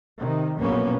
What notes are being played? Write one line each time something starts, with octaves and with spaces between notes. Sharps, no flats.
C3 D#3
A#1 F#2 B2 A#3 B3 C#4